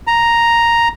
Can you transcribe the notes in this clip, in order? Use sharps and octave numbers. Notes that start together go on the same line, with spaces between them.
A#5